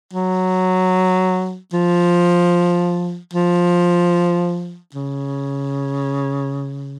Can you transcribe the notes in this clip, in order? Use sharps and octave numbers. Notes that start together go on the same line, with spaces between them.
F#3
F3
F3
C#3